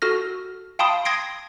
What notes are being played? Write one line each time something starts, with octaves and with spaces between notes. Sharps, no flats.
F#4 A4 F6 A#6
F5 G5 A5 B5 C6 D#6
C6 D#6 G#6 A#6 C7 D7